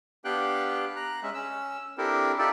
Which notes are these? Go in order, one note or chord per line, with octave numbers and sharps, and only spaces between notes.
B3 D4 G4 F5 G5 F#6
A#5 F#6
G#3 C#4 E5
C#4 E6
C4 D4 E4 G4 A4 A#4
D#4 F4 G4 A4 D5 E5